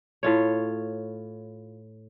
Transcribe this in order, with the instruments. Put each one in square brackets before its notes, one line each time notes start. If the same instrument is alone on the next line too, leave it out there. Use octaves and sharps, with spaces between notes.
[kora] A2 F4 C#5